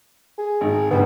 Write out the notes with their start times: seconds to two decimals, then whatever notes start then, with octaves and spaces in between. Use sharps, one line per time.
0.38 G#4
0.61 G#1
0.91 D2 G2 A#2 B3